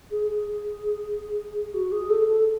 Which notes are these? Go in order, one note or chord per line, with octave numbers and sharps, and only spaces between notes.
G#4
G#4
F#4
G#4
A4
A4